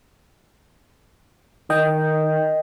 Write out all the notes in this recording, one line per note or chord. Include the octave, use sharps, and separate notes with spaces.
D#3 D#5 G5